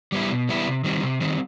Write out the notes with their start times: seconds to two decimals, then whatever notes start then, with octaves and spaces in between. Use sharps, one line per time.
0.12 G3 B3 E4
0.31 B2
0.49 G3 B3 E4
0.67 C3
0.84 D#3 G3 C4
1.03 C3
1.21 D#3 G3 C4